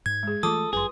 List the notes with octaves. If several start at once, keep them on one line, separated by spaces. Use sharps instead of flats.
G#2 G#6
G#3 G#4
E3 F#3 A3 F4 A4 D6 D#6
G1 F#2 G#4 B4 C6